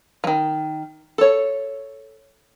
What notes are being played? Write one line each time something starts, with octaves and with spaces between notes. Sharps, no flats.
D#3 F3
A4 C#5